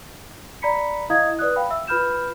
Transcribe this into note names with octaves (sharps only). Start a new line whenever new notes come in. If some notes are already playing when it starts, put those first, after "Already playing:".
D5 A#5 B5 B6 C#7
E4 D#5 F5 D#6 G#6
B4 D5 D#6 F#6
F5 G5 B5
E5 E6
F4 B4 B5 F6 G6 E7